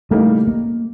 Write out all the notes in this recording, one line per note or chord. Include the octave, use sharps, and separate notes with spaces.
C#3 E3 G3 A3 A#3 D#4
A#3